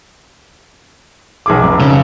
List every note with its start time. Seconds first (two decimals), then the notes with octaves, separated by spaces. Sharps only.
1.46 B1 G#4 D6
1.60 F1 F#2
1.80 C#3